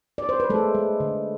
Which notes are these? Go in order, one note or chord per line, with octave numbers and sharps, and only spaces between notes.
D5
C5
B4
G#3 A3 A4
G#3
D3